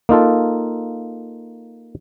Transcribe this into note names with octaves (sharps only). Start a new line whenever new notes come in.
A#3 D#4 F4 A4